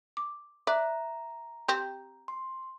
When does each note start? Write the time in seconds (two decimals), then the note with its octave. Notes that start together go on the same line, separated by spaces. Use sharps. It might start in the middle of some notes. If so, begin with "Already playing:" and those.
0.17 D6
0.67 D5 E5 A#5 F#6
1.68 C4 G4 G6
2.28 C6